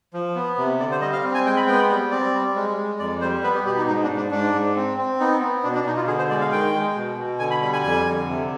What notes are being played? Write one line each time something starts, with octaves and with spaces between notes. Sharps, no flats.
F3
B3
C3
D3 D5
C5
G3 D#5
F5
C4
G#5
G#3 G5
B5
B3 G5
G3
C4 D5
G3
G#3
G#3
F2 D5
G3 C5
B3 B4
G4
B2 G4
D#4
G#2 D#4
D4
G#2
D4
G#2 D4
G#2
C4
C4
B3 D#4
B3
B2 D4
D4
B2 D#4
F4
D3 G#4
C5
G#3 D5
F5
D#3 G5
G#3
B2
B2
D3 G#5
B5
G3 B5
G#5
F2 G#5
D3
C3